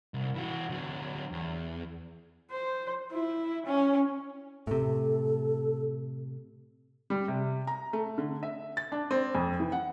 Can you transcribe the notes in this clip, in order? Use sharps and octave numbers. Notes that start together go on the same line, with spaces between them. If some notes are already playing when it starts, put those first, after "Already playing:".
C2
E3 F#4
D3 F#3
E2
C5
E4
C#4
A2 C3 A4
G3
C3
A#5
A3
D3
E5
A6
D4
C4
F2
E3
F#5